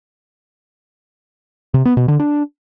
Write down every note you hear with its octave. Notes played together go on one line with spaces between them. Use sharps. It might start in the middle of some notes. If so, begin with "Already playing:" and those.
C3
B3
B2
D3
D4